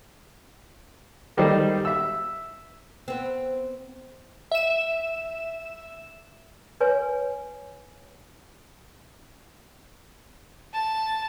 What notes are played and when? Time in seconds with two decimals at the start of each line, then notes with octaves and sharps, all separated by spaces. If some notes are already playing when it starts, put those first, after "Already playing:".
1.37 D#3 G3 D#4 A4 C5
1.85 E5 E6
3.08 B3 C4
4.52 E5 E7
6.81 B4 C#5 G#5
10.74 A5